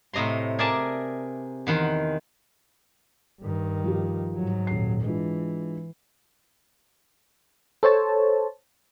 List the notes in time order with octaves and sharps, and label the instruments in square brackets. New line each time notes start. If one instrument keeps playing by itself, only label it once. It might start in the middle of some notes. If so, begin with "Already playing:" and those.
[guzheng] A2 C3 D#5 A#5 C6
G#4 A#4 D5 E5 G#5 A5
E2 D#3 F#5 C6
[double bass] G2 D#3
[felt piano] F3 G4
[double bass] G#2 F#3
[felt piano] D#1 C7
[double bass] E3 [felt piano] G#3 D4 F4
[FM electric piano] A4 C5 C#5 A5